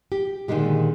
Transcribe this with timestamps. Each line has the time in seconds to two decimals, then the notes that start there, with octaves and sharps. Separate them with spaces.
0.12 G4
0.48 A#2 D3 D#3 G#3 G4